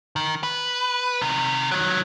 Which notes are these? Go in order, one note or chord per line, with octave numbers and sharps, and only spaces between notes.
D#3
B4
C3 D#3
D#3 F#3